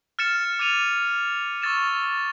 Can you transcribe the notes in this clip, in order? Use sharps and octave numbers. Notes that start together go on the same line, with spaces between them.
F6 A6 C#7 E7
D6 G#6 D#7 F7
C#6 E6 A6 E7